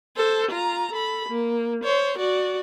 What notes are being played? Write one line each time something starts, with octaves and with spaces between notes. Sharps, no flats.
A4 C5
F4 A#5
A4 B5
A#3
C5 C#5
F#4 D5